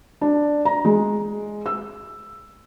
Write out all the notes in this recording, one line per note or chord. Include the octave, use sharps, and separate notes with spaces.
D4
A#5
G#3
E6